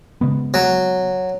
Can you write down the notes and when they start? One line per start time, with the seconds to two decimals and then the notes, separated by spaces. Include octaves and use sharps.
0.21 C#3 G#3 B3
0.54 F#3